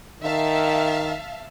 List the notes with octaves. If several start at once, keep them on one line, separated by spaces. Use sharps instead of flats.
D#3 E5 F5 A5